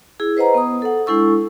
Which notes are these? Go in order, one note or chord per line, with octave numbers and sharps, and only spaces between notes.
E4 G#4
B4 C5 D#5 F#5 A#5
B3 D#6
A4 F#5
G#3 D4 E4 A4 C#6 E6